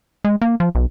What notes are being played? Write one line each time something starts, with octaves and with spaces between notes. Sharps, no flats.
G#3
A#3
F3
B1